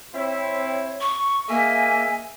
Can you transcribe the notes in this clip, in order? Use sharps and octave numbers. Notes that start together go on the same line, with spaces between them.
C4 E4 C#5
C#6
A#3 G#4 D#5 E5 G#5